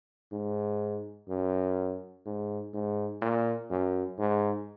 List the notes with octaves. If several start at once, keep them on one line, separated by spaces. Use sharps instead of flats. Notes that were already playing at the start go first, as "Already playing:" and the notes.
G#2
F#2
G#2
G#2
A#2
F#2
G#2